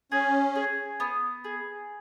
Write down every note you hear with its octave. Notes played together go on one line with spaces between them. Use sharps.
C#4 G#4
G#4
B3
G#4